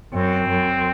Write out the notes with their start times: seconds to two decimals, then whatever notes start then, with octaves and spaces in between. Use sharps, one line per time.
0.13 F#2 C4
0.49 F#2